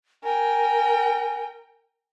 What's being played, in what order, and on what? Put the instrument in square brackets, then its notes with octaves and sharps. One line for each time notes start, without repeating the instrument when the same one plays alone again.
[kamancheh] A#4 G5 [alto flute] G#5